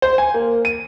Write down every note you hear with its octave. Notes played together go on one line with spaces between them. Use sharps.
C5
G#5
A#3
D#7